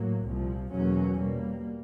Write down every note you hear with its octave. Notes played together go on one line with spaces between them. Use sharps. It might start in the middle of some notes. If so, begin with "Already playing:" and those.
Already playing: A2 F#3 A#3
C2 A#2 F3
E2 B2 F#3 A#3 C#4
B2 G3 A#3